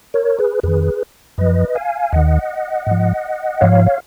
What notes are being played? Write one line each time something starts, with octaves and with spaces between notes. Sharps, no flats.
A#4 C#5
G#4 B4
F2 D#3 G#4 B4
F#2 F3 B4 D#5
F5 G#5
D#2 D#3 D#5 F#5
G#2 F3
G#2 F3 C#5 F5
C#5